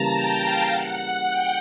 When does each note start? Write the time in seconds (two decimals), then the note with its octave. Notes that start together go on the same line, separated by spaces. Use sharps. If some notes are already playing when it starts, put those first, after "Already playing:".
Already playing: C#3 E3 G3 A#3 A5 A#5
0.13 G5
0.42 F5
0.70 F#5
1.28 G5